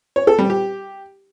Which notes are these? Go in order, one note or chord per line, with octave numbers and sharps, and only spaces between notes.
C#5
A4
G3
G4